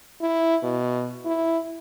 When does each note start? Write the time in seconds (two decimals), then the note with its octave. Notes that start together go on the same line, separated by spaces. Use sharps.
0.22 E4
0.63 B2
1.25 E4